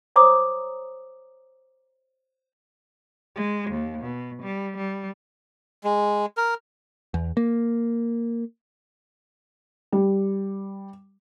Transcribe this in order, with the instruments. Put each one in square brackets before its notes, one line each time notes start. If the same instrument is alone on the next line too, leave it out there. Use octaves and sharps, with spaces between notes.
[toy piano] C5 C#5 A#5 D6 D#6
[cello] G#3
D#2
B2
G3
G3
[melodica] G#3
A#4
[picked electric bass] E2
A#3
[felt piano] G3